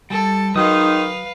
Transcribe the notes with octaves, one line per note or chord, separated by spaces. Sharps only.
G3 A4
D#3 F#3 G#3 D#4 B4 F5 D#6